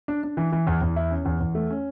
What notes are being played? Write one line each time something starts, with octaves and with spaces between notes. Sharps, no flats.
D4
D4
E3
E3
E2
E2
E4
C#4
E2
E2
A3
C#4